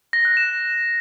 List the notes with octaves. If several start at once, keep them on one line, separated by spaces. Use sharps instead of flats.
A#6
F#6
E7